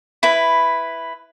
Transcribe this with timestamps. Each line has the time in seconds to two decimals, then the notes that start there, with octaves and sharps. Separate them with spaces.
0.23 E4 B4